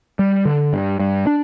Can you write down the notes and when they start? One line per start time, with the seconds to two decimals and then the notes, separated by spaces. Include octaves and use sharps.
0.19 G3
0.45 D3
0.73 G2
0.99 G2
1.27 D4